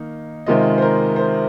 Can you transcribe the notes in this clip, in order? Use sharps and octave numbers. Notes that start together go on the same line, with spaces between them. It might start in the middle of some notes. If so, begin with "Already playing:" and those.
Already playing: D#3 A#3 D#4
C3 D#3 G#3 F4 D#5
C5
A#4
C5